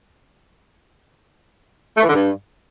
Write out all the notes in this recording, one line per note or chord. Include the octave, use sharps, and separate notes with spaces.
A3
E3
D3
G2